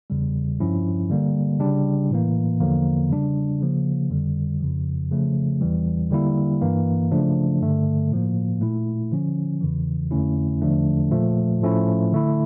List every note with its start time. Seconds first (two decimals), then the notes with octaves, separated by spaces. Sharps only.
0.10 E2 C#3 G3
0.60 G2 F3 C#4 E4
1.10 D3 G3 A#3
1.60 C#3 G3 D4
2.10 A2 E3 A#3
2.60 E2 D3 F3 A#3
3.10 C#3 G3 D4
3.60 C#3 F3 A#3
4.11 F2 D3 G3
4.60 F2 C#3 F3
5.11 C#3 F3 A3
5.61 E2 E3 G3
6.11 D3 G3 A#3 E4
6.61 G2 E3 A#3
7.12 C#3 F3 A3 D4
7.62 G2 D3 A3
8.11 A2 F3 A#3
8.61 A#2 A3 E4
9.12 D3 F3 C#4
9.61 E2 C#3 E3
10.11 F2 D3 A3 C#4 E4
10.62 E2 D3 F3 A3 D4
11.12 A#2 F3 A3
11.61 A2 F3 A3 C#4 E4
12.12 D3 A3 E4